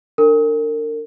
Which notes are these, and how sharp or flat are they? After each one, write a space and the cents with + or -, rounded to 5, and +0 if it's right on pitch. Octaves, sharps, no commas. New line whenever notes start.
D4 +0 A#4 -35